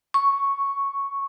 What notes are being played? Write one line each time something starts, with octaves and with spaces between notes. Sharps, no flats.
C#6